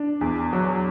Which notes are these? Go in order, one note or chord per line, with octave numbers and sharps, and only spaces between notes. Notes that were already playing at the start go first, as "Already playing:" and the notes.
Already playing: D4
E2
F#3